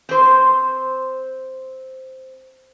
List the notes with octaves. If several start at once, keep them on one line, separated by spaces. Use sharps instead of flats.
C4 C5